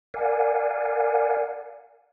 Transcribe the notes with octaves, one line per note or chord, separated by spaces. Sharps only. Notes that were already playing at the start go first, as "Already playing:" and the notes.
A#4 D5 F5 F#5 G#5